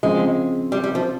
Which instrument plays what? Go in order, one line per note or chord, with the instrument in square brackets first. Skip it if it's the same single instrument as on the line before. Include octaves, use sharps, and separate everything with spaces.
[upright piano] C#3 F3 C4 [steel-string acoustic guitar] G#3
[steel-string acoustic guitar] G3
G3
F3